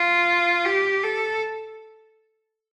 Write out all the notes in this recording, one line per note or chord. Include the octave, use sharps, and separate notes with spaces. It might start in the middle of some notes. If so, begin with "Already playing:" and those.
Already playing: F4
G4
A4